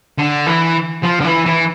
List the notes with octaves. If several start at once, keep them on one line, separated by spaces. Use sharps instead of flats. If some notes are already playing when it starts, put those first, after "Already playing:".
D3
E3
F3
D3
E3
E3